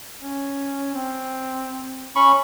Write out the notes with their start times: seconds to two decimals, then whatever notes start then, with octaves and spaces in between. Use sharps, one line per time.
0.20 C#4
0.95 C4
2.16 C#4 B5 C#6